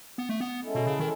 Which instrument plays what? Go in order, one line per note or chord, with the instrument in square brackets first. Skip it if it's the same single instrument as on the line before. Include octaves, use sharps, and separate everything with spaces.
[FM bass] B3
A3
B3
[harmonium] G#3 C#4 E4 A4
[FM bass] B2
C#3
D#3